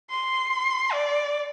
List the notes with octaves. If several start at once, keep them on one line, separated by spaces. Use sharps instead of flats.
C6
D5